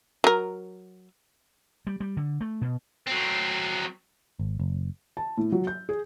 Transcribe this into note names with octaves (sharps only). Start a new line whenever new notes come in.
F#3 A#4
G3
G3
D3
A3
B2
F#3 C4
G#1
F#1
A5
A2
F#3
G6
G#4